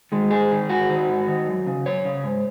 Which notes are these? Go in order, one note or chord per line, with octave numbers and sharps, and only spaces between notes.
D#3 G#3
G#2 G#4
D#3
G#2 F#4
D#3
G#2
D#3
F#2
C#3
F#2 C#5
C#3
G#2